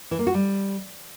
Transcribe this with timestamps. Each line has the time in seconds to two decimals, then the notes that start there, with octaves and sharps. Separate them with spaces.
0.11 E3
0.19 A#3
0.27 F#4
0.34 G3